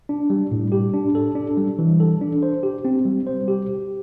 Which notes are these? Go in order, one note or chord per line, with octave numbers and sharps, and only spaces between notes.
D4
G3
A2
G4
D4
A4
D4
G3
E3
A4
D4
C5
G4
C4
G3
C5
G4
G4